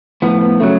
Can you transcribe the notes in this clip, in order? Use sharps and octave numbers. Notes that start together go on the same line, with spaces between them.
A2 F3 B3
B3
C#3 F#3 A3